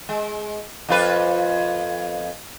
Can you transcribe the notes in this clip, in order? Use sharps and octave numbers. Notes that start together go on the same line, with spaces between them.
G#3
F2 F4 B4